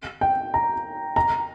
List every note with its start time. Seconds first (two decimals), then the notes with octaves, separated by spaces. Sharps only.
0.21 G5
0.54 A#5
1.16 A#5